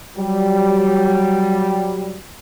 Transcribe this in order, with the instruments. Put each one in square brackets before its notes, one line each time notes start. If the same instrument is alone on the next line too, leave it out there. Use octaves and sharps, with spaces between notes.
[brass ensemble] F#3 G3